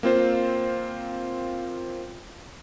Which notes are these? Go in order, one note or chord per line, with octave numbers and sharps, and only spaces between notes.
A#3 C4 F4 C5